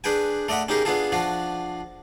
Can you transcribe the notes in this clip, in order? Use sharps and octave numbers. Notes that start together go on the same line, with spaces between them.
D4 G#4 B4 G5 G#5
A3 D5 D#5 F#5 B5
C#4 D#4 G4 G#4 A#4
B3 D4 F4 G#4 A4
F3 D4 F4 F#4